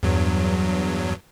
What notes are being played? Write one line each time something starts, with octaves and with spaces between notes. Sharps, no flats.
E2 G2 F#3